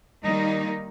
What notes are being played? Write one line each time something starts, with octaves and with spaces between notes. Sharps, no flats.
D#3 G3 A#3 D#4